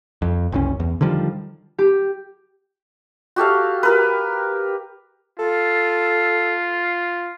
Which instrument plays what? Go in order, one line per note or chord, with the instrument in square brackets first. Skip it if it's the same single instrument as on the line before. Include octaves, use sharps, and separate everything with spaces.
[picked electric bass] F2
F#1 C2 C#4
E2
D3 D#3 F3 G3
[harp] G4
[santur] F#4 G4 A4 F5
G4 A#4 B4
[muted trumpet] F4 [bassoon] A4